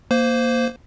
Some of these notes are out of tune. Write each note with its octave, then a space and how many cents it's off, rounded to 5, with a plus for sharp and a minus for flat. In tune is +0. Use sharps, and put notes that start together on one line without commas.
A#3 +0 C5 -15